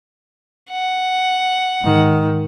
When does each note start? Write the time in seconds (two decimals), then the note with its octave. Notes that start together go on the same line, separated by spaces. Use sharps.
0.71 F#5
1.81 G#2 D#3